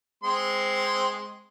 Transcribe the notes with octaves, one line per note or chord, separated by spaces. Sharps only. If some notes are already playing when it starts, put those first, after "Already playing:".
G#3 C4 C6